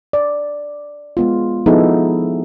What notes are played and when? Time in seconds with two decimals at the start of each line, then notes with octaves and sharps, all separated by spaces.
0.13 D5
1.17 G#3 B3 F4
1.66 F3 B3 D#4 E4 G#4 A4